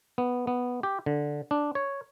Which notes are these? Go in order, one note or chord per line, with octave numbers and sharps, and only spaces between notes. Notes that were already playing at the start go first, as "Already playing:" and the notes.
B3
B3
G4
D3
D4
C#5